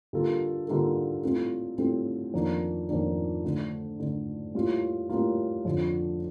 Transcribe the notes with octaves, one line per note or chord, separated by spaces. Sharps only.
D3 G3 A#3 F4 A4
D3 G3 A#3 F4 A4
A2 G3 C4 F4 A4
A2 G3 C4 F4 A4
F2 D#3 A#3 D4
F2 D#3 A#3 D4
D3 A3 D4
D3 A3 D4
A2 G3 A#3 F4
A2 G3 A#3 F4
F2 D3 F3